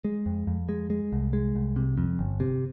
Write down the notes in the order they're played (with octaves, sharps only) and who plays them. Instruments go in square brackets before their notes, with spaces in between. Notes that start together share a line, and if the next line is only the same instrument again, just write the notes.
[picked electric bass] G#3
F2
F2
G#3
G#3
C2
G#3
C2
C3
F2
G1
C3